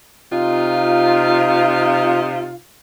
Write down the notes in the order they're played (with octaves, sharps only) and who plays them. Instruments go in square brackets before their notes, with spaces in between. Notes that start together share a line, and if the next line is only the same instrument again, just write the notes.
[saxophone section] C3 D#4 F4